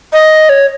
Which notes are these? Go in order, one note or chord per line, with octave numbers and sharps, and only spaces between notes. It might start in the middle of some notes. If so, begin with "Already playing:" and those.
D#5
C#5